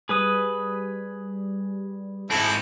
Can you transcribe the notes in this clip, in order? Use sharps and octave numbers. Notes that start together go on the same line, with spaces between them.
G3 G#4 B4 D#6
G#2 C4 E4 A4